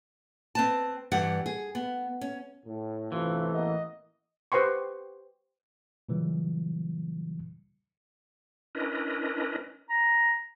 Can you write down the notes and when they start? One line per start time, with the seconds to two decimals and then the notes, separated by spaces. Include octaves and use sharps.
0.55 C4 B4 A5
1.11 G2 E3 G3 G4 F#5
1.46 G#4
1.75 B3
2.21 C#4
2.66 A2
3.12 A1 G2 C3 E3 A3 F4
3.53 A1 A#3 B3 D#5
4.52 G4 B4 C5 G5 C6 C#6
6.09 A#2 C#3 E3 F#3 G3
8.75 C#4 D4 E4 A#4 B4 D#5
9.89 A#5